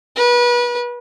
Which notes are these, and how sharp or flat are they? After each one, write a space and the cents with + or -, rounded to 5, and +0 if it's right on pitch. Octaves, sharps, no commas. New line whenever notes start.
B4 -30